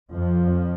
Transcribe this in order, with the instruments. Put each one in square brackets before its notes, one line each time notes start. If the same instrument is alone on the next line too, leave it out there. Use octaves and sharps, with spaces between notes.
[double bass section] F2 F3